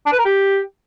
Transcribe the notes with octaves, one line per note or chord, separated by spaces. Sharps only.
D4
B4
A#4
G4